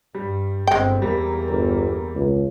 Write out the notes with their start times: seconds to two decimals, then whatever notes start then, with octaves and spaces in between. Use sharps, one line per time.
0.15 G2 G3
0.67 G1 G#3 C4 G5
1.02 E2 G3 A#3
1.49 G1
2.15 C#2